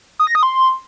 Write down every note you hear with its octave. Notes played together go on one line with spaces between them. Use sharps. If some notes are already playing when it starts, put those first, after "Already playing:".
D#6
A#6
D#6
C6